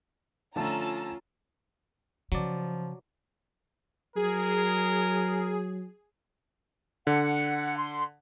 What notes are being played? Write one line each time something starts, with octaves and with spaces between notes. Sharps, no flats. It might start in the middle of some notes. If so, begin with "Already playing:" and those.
D3 F3 A3 C#4 F4 A5 A#5 E6
C#3 F3 F#3 D5
F#3 G#4 A#4
D3 F#5
C6